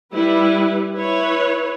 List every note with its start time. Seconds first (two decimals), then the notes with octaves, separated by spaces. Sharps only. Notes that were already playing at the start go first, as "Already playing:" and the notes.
0.14 G3 E4 B4
0.96 E4 B4 C#5